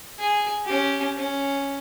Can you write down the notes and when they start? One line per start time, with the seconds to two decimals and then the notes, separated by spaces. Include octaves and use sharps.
0.19 G#4
0.65 C#4 G4
1.16 C#4